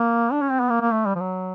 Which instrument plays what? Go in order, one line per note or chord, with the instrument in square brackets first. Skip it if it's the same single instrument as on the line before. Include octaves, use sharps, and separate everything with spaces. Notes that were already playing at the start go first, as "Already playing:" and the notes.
Already playing: [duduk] A#3
D4
C#4
C4
B3
A#3
A#3
A3
G3
F3
F#3